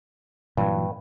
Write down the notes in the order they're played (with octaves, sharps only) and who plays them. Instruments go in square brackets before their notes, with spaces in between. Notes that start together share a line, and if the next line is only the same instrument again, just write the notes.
[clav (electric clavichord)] G2 [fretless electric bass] A#2 E3 F#3